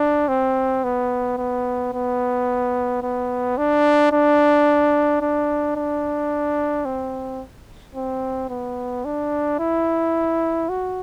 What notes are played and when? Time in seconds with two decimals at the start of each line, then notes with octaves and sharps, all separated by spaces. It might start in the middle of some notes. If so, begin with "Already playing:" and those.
Already playing: D4
0.28 C4
0.84 B3
1.38 B3
1.93 B3
3.03 B3
3.58 D4
4.12 D4
5.21 D4
5.76 D4
6.85 C4
7.95 C4
8.50 B3
9.05 D4
9.59 E4
10.69 F#4